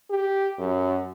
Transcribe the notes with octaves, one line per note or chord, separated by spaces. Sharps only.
G4
F#2